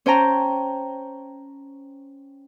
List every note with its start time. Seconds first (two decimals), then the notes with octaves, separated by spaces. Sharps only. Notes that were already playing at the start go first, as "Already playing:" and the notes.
0.06 C#4 C5 G5 A5 A#5